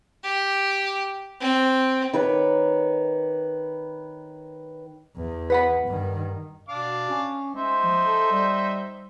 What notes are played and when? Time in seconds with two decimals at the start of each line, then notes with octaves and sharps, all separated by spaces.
0.24 G4
1.40 C4
2.13 D#3 B4 C#5 D6
5.16 E2
5.50 B4 F#5 B5
5.87 G2 D#3
6.69 B2 D4 F5 D6
7.10 C#4
7.55 G#3 D#4 C5 E5
7.84 F3
8.04 A4
8.31 G3